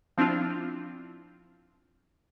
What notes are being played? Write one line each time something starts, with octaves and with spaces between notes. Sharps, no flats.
F3 C4 D4 E4 F4